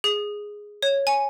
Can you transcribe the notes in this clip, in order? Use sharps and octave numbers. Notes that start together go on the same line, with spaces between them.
G#4
C#5
G#5